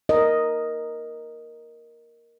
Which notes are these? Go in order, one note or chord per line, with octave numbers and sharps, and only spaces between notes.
A#4 D#5